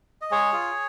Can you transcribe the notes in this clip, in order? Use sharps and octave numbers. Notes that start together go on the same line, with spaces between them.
D#5
G#3 G#4 C#5
F4